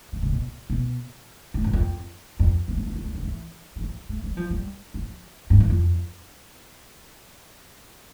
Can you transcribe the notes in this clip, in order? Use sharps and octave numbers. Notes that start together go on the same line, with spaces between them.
E3
C3
B2
B2
A2
G2
F2
F2
E2
F2
E2
F2
G2
D3
E3
G3
F3
A3
G3
F3
G3
F3
G2
E2
F2